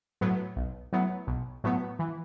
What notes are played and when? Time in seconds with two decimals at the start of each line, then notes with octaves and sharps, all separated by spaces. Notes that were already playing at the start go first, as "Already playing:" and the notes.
0.21 A2 F#3 B3
0.56 B1
0.93 A2 F#3 B3
1.27 B1
1.64 A2 F#3 B3
1.99 E3